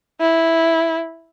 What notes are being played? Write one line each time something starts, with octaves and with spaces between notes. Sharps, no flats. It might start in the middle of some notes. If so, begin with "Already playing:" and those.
E4